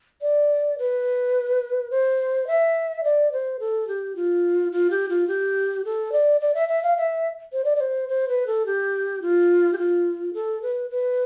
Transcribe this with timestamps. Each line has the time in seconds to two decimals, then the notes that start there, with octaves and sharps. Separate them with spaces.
0.22 D5
0.78 B4
1.91 C5
2.47 E5
3.04 D5
3.32 C5
3.59 A4
3.88 G4
4.16 F4
4.72 F4
4.91 G4
5.09 F4
5.28 G4
5.85 A4
6.12 D5
6.41 D5
6.55 E5
6.68 E5
6.83 F5
6.97 E5
7.53 C5
7.64 D5
7.76 D5
7.80 C5
8.09 C5
8.28 B4
8.47 A4
8.66 G4
9.22 F4
9.73 G4
9.78 F4
10.34 A4
10.62 B4
10.90 B4